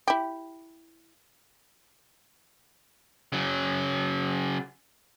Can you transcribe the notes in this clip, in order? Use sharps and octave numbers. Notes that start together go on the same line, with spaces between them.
E4 G4
C#3 F#3